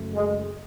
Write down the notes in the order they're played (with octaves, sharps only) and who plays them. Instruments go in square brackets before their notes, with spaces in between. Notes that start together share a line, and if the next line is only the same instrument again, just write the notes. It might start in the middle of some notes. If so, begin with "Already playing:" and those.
Already playing: [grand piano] F#1 F#2 C#3 F#3 A3
[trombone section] G#3